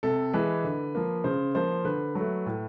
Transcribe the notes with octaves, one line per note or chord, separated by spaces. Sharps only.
C3 A4
E3 G#3 B4
D3
F3 A#3
C#3 C5
F3 A#3 C5
D3 B4
F#3 A3
A2